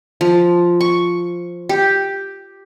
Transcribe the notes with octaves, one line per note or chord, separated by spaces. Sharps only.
F3
C#6
G4